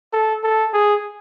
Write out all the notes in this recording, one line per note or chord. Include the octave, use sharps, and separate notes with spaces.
A4
A4
G#4